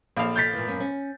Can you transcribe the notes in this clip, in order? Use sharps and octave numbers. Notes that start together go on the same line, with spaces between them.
A#1 A4 C#5 F5
G6 A6 B6
A#2 E3
F#2 A#3 C#4
C#4